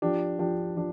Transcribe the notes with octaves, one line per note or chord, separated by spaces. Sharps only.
F3 D4 G4
F3 D4 G4
F3 D4